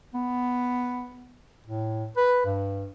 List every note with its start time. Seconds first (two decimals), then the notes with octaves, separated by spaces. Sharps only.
0.15 B3
1.66 A2
2.17 B4
2.45 G2